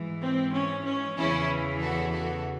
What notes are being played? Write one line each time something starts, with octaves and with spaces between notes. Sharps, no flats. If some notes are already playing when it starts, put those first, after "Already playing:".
Already playing: G#2 E3
C4
C#4
C#4
E2 C#3 E3 C#4 E4
F#4 A4
F#4 A4